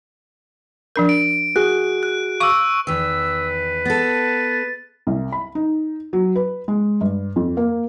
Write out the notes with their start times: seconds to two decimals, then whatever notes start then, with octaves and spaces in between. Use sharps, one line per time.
0.96 F3 D4 A#4
1.09 D7
1.56 F#4 G#4 F#6
2.03 F#6
2.40 F5 C#6 D6 E6
2.87 E2 D#3 B4 E6
3.85 B3 A4 A6
5.07 C2
5.32 B5
5.55 D#4
6.13 F#3
6.36 B4
6.68 G#3
7.01 G2
7.36 F2
7.57 A#3